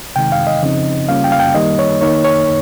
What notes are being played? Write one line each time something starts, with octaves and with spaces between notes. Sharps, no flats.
C3 D#3 G#3 D#4 G5
F5
D#5
C#3 F3 C4 D#4
C#3 G3 A#3 C#4 F4 F5
G5
F5
G5
D#3 G3 A#3 D#4 D#5
C#5
D#3 A#3 D#4 C#5
C#5